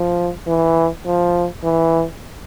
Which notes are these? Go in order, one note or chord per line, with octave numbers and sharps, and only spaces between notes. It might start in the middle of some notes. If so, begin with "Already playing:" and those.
Already playing: F3
E3
F3
E3